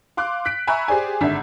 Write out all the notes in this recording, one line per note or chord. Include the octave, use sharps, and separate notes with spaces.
F5 C6 D6 F#6
F#6 B6 D7
E5 G#5 A#5 B5 C#6 F#6
G4 G#4 C5 D5 G#5
G#1 D3 D4 E5